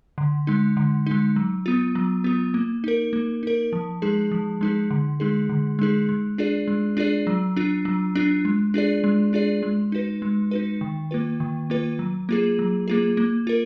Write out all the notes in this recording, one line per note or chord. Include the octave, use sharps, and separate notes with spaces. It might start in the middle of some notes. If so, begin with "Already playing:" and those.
D3
G#3 D#4
D3
G#3 D#4
F#3
B3 F4
F#3
B3 F4
A#3
D#4 A#4
A#3
D#4 A#4
F3
G#3 D#4 G#4
F3
G#3 D#4 G#4
D3
G#3 D#4 G#4
D3
G#3 D#4 G#4
G#3
D4 F4 G#4 D5
G#3
D4 F4 G#4 D5
F#3
D4 F4
F#3
D4 F4
G#3
D4 F4 G#4 D5
G#3
D4 F4 G#4 D5
G#3
D#4 F#4 B4
G#3
D#4 F#4 B4
D#3
A#3 F4 B4
D#3
A#3 F4 B4
F#3
A#3 F4 G#4
F#3
A#3 F4 G#4
A#3
F4 A#4